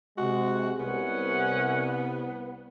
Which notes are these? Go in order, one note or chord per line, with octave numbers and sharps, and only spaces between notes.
C3 G#3 F#4
C2 B3 C#4 F#5